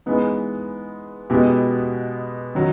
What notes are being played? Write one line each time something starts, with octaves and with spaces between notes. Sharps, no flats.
E3 G#3 B3 D#4
B2 G#3 B3 E4 G4
D#3 F#3